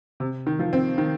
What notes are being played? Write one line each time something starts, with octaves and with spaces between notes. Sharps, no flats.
C3
D#3
F3
C4
D#3